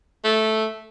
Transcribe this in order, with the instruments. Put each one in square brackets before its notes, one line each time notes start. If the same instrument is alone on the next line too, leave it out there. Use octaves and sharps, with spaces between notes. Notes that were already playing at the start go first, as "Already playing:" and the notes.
[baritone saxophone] A3